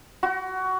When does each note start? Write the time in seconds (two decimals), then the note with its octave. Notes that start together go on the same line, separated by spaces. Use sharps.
0.23 F#4